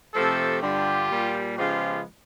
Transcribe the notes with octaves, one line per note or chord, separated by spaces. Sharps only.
C3 F3 A3 G4 A4
G2 D3 G3 F4 G4
A#2 G3 A#3
C#3 F3 G#3 B3 F4 G4